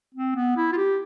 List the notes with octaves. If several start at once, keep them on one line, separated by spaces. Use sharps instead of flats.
C4
B3
E4
F4
G4